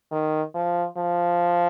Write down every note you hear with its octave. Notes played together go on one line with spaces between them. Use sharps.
D#3
F3
F3